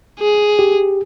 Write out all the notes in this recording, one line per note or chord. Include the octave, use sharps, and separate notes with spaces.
G#4
G4